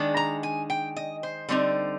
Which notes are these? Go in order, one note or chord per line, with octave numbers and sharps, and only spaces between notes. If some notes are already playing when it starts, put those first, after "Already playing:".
Already playing: D#3 G#3 D4
A#5
G#5
G5
D#5
C5
D3 G3 C4 D#4